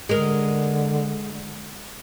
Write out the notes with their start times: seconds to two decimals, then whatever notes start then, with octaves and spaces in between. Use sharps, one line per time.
0.09 D3 G#3 A#4